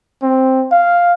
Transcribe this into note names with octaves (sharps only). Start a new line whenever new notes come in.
C4
F5